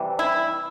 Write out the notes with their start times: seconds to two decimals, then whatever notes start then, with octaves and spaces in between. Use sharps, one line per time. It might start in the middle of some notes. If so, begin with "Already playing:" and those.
Already playing: C3 E3 G3
0.19 E4